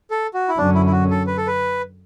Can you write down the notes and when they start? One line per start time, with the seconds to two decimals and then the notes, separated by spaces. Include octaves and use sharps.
0.11 A4
0.34 F#4
0.49 E4
0.58 F#2 D3 F#3 C#4 D4
0.75 E4
0.86 E4
0.92 F#4
1.11 A4
1.27 B4
1.37 A4
1.47 B4